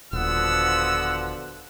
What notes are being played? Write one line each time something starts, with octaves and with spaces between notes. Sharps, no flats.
D#1 B2 D3 F3 B3 F#5 E6